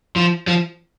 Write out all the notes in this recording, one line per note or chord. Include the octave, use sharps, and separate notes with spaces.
F3
F3